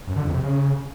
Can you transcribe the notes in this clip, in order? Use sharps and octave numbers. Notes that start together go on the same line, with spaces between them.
F#2
D3
F2
C3
C#3